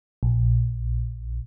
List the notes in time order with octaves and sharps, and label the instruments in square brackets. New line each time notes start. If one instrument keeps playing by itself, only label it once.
[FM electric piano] A#1